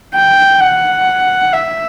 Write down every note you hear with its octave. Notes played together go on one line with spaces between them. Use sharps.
G5
F#5
E5